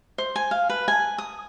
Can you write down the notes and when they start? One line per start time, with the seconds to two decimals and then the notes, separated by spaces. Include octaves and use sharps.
0.18 C5
0.36 G#5
0.51 F5
0.69 B4
0.88 G#5
1.18 D#6